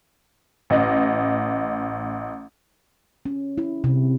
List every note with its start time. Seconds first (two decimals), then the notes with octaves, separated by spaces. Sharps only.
0.70 A1 D#5
3.26 C#4
3.58 E4
3.84 C3